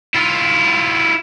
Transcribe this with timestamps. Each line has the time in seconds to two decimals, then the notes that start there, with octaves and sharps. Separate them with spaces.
0.15 E4 F4